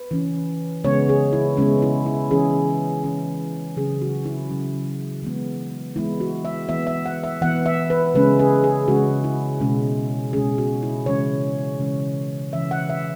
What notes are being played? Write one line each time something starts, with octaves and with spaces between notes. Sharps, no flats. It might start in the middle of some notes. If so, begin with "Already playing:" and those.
Already playing: B4
E3 C#4
C#3 G#3 B3 C#5
G#4
E4
C#3 G#3 B3 C#4
E4
E4
E3 C#4 G#4
E3 C#4
C#3 F#3 C#4 G#4
F#4
E4
C#3 F#3 C#4
E3 G#3 B3
E3 G#3 B3 E4
F#4
E5
E3 B3 E5
E5
F#5
E5
E3 B3 F#5
E5
B4
C#3 G#3 C#4 B4
G#4
G#4
C#3 G#3 C#4 F#4
E4
B2 G#3 C#4
B2 G#3 C#4 G#4
F#4
E4
C#3 E3 G#3 C#4 C#5
C#3 E3 G#3 C#4
C#3 E3 C#4 E5
F#5
E5